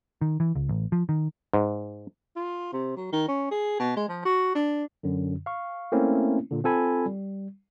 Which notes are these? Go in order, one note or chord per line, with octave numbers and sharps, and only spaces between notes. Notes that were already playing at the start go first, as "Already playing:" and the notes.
D#3
E3
C#2
A1
F3
D#3
G#2
F4
C3
F#3
D#3
C#4
G#4
B2
G#3
F3
F#4
D4
F#2 D3
F5 C#6
A3 A#3 C4 C#4 E4
A#2 D3
C4 F4 A4 G#5 B5
G3